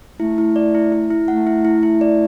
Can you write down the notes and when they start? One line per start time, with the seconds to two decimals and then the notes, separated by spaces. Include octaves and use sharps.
0.20 A3 E4
0.38 E4
0.56 D5
0.75 E4
0.92 E4
1.11 E4
1.28 A3 F#5
1.47 E4
1.65 E4
1.83 E4
2.01 D5